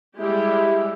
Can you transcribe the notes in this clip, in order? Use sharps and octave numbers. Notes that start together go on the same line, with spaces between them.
G3 G#3 E4 G4